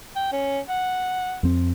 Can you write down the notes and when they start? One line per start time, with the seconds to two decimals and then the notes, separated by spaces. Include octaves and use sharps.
0.16 G5
0.32 C#4
0.69 F#5
1.43 F2 C4